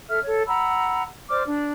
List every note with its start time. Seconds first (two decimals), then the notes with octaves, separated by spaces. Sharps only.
0.10 A4 E5 F6
0.23 A4 C#5
0.47 F#5 A#5 B5 E6
1.30 C5 D5 D6 F6
1.45 D4